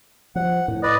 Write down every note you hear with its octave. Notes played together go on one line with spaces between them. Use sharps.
F3 F#5
A2
B4 D5 D#5